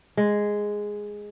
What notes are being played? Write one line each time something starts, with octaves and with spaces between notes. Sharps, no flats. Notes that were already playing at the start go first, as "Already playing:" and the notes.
G#3